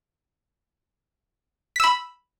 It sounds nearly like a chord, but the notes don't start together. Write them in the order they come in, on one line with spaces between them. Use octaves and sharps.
B6 E6 B5